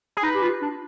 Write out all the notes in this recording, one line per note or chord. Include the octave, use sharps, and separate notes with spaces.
G#4
D#4 B4
G4
F4
D4